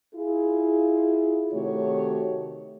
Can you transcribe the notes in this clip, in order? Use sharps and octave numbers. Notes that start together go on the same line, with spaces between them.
E4 F4 G#4
C3 D#3 A3 F#4 G4 C#5